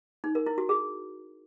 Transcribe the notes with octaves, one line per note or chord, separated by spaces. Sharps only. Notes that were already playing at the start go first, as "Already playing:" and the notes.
D#4
A#4
E4
F#4
G#4